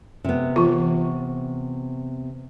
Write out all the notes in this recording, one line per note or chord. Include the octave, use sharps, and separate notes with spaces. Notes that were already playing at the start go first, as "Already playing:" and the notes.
C3 B3
E3 F4